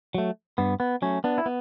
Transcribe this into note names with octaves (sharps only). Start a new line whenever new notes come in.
F#3 A3
G2 B3
B3
F#3 A3 C#4
B3 D4
E4
B3